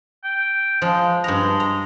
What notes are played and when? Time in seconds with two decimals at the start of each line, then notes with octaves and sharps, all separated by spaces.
0.24 G5
0.82 F3 G#3
1.24 G2 G#3 A#5
1.60 A#5